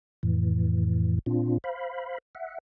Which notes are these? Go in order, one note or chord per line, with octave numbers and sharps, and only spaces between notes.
F2 A2 E3
A#2 C4 D4 F4
C5 F5 B5
E5 F#5